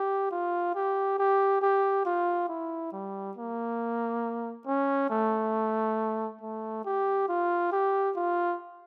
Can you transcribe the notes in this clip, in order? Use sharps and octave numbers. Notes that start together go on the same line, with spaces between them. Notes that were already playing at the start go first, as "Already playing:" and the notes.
Already playing: G4
F4
G4
G4
G4
F4
E4
G3
A#3
C#4
A3
A3
G4
F4
G4
F4